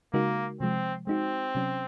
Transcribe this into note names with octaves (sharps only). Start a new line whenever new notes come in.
C#3 G#3 A#3 D#4 F#4 A#4
C3 F3 G#3 C4
G#3 C4 D#4 F#4
C3 F#3 C#4